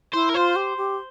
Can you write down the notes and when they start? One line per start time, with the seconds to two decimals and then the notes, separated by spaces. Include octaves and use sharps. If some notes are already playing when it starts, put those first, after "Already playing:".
0.13 E4 C5
0.30 A#4
0.35 F4 C5
0.56 G4
0.77 G4